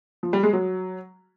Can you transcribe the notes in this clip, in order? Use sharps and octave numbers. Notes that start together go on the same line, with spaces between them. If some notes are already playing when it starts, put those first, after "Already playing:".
F3
G3
G#3
F#3